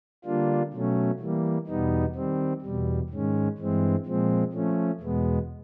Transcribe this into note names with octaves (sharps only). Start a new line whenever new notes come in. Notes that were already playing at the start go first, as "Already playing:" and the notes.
D3 G3 A#3 D4 F4
B2 F#3 A3 C#4
E3 G3 A#3
E2 B2 G3 B3 D#4
D#3 G3 C4
E2 B2 G3
G#2 D#3 G#3 C#4
G2 E3 G#3 C4
A#2 F3 G#3 C4
F3 A3 C#4
E2 B2 G#3 B3